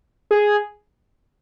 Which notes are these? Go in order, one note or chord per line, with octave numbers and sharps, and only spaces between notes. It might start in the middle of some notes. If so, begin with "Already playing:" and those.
G#4